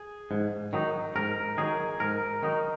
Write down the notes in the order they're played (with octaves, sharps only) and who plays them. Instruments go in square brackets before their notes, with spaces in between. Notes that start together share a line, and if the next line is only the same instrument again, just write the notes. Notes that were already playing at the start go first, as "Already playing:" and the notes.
Already playing: [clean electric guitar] G#4
G#2
D#3 F#3 D#4
G#2 A#4
D#3 F#3 D#4 G#4
G#2 A#4
D#3 F#3 D#4